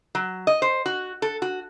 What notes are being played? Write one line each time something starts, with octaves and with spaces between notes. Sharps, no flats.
F#3
D#5
C5
F#4
A4
F#4